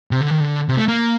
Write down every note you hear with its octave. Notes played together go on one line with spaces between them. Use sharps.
C3
D3
D#3
D3
C3
A3
A#3